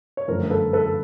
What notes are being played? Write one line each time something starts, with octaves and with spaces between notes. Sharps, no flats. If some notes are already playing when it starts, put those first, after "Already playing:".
C#5
G1 F#2 D3 F3 A3 A#4 C5
A#4
A4 B4
A4 B4
A4